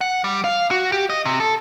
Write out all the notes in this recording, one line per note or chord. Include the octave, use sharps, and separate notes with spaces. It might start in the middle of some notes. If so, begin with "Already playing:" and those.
F#5
G3
F5
F#4
G4
D#5
C3
A4